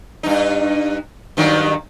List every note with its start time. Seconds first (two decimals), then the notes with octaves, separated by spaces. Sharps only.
0.23 G2 D#4
1.37 G2 D#3 F#3